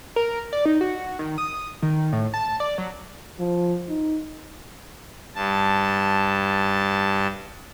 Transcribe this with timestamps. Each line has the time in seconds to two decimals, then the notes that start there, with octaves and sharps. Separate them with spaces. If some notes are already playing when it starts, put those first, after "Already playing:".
0.16 A#4
0.53 D5
0.65 D#4
0.81 F#4
1.19 D#3
1.38 D#6
1.82 D#3
2.13 A2
2.34 A5
2.60 D5
2.78 F#3
3.39 F3
3.88 D#4
5.35 G2 A5